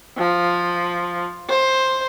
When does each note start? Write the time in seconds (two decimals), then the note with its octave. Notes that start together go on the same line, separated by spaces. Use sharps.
0.18 F3
1.49 C5